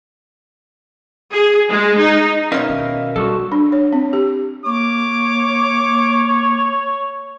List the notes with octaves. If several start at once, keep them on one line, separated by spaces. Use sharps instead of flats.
G#4
G#3
D#4
B2 C#4 D#4 A#4 E5 F5
D#2 D#3
G3 F#4 G4 A4
D4
C#5
C4
G4
A#3 C#5 D6